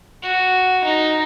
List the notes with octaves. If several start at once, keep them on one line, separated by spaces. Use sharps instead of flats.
F#4
D#4